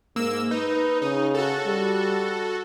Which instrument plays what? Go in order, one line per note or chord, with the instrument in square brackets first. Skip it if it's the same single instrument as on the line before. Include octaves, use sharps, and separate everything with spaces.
[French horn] G#2 [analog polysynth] A#3 E6
[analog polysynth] D#4 [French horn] B4
[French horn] C#3 [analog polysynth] D#4
[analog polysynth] F#4 A4
[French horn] G3